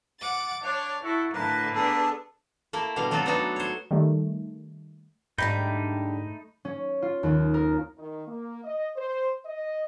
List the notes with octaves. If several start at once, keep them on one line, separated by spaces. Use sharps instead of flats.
F#5 D6 A6
D4 C#5 F5
E4 F#4 A4
A2 D3 A#3 B4 A5
B3 D4 G#4 A4
A3 A#3 E4
B2 D3 G3 F5
F#3 A3 C4 F4 F#4 A4
B3 D4 D#4 F#4 A4
C5 C#5
D#3 G3 A3
G#2 D3 G3 A3 D#4 G5 B5 G6
C#4
F4
D#2
A#4
D#3
A#3
D#5
C5
D#5